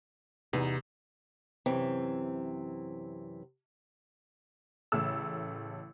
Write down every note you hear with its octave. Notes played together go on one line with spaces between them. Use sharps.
E2 C3 B3 D#4
F#2 C3 E3 C4
A1 C#3 A3 E6